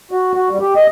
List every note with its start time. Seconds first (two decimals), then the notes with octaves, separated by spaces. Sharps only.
0.11 F#4
0.34 F#4
0.49 G3
0.61 G4
0.76 D#5